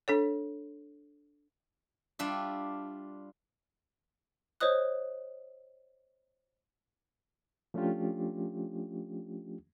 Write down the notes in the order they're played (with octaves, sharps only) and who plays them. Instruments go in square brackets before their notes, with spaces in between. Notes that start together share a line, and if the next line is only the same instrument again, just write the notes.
[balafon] D4 A4 C#5
[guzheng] G3 D4 F4 E5
[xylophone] C5 C#5 D#5 D#6 F#6
[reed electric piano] F3 A3 C#4 D4 F4 G4